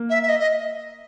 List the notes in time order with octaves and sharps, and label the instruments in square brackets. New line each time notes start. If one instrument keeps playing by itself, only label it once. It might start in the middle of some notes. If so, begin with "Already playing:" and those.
Already playing: [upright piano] A#3
[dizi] E5
E5
D#5
D#5